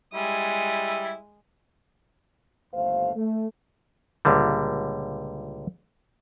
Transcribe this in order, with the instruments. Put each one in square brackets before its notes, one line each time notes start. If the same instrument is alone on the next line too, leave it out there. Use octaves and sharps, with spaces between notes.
[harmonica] G3 E4 [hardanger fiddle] G#3 D#6
[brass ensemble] G1 D#2 A3 C5 F5
A3
[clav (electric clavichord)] C#2 A#2 D3 G3